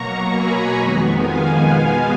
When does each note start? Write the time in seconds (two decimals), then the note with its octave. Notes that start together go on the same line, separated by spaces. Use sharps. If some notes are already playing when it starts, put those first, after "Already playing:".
Already playing: B2 F#3 A#3 A#5 C#6
0.31 G#5 B5
0.74 F2 D#3 G#3 B3
1.18 F5 G#5
1.61 B2 G#3 B3